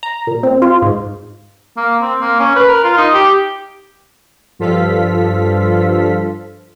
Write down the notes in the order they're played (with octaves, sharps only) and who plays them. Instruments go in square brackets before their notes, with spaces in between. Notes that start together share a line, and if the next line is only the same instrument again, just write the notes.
[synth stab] A#5
A#2
C4
F4
G#2
[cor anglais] A#3
C4
A#3
C#4
B4
A#4
F4
D#4
G4
[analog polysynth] G2 F3 F4 A4 F5 B6